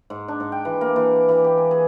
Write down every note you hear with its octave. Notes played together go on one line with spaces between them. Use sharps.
G#2
D4
G#2
G5
E3
A#3
E3
D6
E3
G4
G#5
G#4